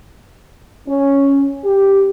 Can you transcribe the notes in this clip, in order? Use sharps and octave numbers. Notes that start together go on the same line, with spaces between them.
C#4
G4